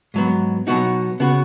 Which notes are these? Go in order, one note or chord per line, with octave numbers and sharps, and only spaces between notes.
G#2 F#3 B3
B2 F#3 B3 D#4 F#4
C#3 B3 F#4